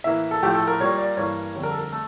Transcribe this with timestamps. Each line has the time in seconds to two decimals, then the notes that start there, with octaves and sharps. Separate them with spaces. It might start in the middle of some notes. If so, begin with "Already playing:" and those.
0.04 A2 E3 A#3 E5
0.31 A4
0.43 A2 F3 A3 G4
0.55 A4
0.67 A#4
0.80 A#2 G3 A#3 C#5
0.98 D5
1.17 G2 E3 A#3 C#5
1.55 F2 D3 G3 C#5
1.63 A#4
1.71 A4
1.78 A#4
1.92 A3 A4